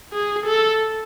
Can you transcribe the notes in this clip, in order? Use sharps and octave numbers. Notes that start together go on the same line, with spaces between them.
G#4
A4